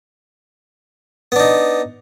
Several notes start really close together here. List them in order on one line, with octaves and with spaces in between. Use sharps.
B3 D4 D#4